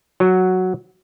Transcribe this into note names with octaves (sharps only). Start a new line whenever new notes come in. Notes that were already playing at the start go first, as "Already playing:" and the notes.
F#3 F#4